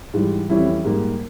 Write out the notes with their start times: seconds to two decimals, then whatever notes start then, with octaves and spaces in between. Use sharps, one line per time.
0.14 G#2 E3 G3
0.50 F2 E3 G3 C#4 E4
0.84 G#2 G3 A#3